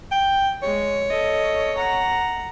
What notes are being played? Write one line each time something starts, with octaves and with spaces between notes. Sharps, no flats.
G5
G#3 C#5
A4 D#5
F#5 A#5